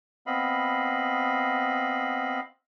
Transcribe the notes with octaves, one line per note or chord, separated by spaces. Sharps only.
B3 C4 D#5 F5 B5